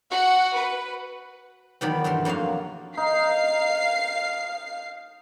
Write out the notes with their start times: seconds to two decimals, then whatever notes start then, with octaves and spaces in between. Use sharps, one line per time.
0.11 F#4 F#5
0.54 B4
1.81 E2 B2 D#3 F#3 D5 B5
2.04 E2 G2 A3 A#4 C6
2.25 F2 F#3 A#3 F#4 F5
2.97 D#4 F5 C7